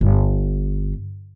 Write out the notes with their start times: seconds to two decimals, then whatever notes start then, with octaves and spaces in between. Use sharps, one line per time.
0.01 G1